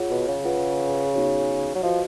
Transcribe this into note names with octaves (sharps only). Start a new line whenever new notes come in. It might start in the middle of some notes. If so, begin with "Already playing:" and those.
Already playing: F4 G#4 C#5 F#5
B2
C#3
F4 G#4 B4 F#5
B3 D#4 F#4 C#5 G#5
F#3
F3 F#4 B4 D#5